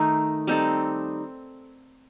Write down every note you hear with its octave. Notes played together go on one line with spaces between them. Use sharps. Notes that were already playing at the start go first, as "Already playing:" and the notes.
Already playing: D#3 A3 D#4
G3 C4 D#4 A4